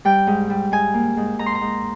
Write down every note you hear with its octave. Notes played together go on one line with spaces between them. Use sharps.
G3 G5
G#2
G3
G#2 G#5
A#3
G#2
G#2 A#5
C6
A#5
G#2